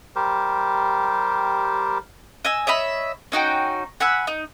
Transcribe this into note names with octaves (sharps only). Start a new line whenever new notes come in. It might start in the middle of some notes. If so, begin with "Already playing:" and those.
G3 G4 A#4 C5
D#5 G#5 E6
C#5 D#5 E5 B5
C#4 D#4 F#4 G5
F#5 G#5 B5 E6
D#4